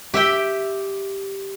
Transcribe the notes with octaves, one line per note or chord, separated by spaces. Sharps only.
G4 E5 G5